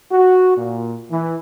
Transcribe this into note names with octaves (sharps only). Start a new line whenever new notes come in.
F#4
A#2
E3